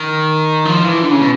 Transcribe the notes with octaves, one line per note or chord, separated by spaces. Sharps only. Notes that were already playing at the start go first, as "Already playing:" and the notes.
Already playing: D#3
F3
E3
D3
C#3
B2